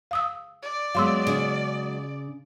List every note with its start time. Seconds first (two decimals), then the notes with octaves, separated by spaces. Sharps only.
0.11 F5 D#6 E6
0.63 D5
0.95 F#3 G#3 B3 F5 C6 E6
1.27 C#3